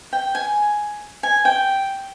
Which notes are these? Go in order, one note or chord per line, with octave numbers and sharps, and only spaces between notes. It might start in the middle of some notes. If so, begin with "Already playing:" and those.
G5
G#5
G#5
G5